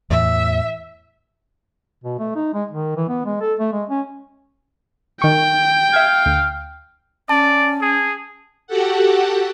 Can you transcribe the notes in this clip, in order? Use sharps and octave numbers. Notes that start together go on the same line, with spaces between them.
E2 A2 E3 E5
B2
A3
D#4
G#3
D#3
E3
B3
G#3
A4
A3
G#3
C#4
D#3 G5 C#6
E5 F5 G#6
D2
C#4 D5 A5
G#4
F#4 G4 A4 F#5